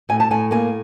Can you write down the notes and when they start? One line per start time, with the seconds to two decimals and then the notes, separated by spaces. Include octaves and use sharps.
0.09 A2 G#5
0.20 A5
0.31 A2 G#5
0.51 A#3 G#5